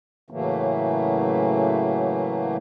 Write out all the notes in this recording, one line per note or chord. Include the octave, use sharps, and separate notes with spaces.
A2 C#3 E3 F#3 A3 A#3